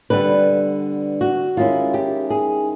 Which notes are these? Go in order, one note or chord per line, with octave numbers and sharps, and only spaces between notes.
D3 G3 B3 B4
F#4
D#3 G#3 C#4 E4 F4
G4
G#4